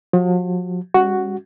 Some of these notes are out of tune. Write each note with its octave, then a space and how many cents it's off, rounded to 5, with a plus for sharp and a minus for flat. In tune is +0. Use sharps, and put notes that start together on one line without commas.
F3 +45 F#4 +45
G3 +40 C#4 -15 F#4 +5